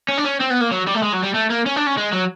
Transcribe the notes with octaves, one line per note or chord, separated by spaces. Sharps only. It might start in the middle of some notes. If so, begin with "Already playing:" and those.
C#4
D4
C#4
C4
B3
A#3
F#3
G3
A3
G#3
F#3
G3
A3
A#3
C#4
D4
C#4
G#3
F#3